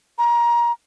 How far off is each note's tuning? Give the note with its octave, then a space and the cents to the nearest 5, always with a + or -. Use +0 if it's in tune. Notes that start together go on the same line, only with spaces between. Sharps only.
A#5 +25